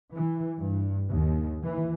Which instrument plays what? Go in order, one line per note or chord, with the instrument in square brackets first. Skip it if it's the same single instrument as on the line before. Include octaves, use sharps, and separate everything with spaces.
[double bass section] E3
G2
D#2
E3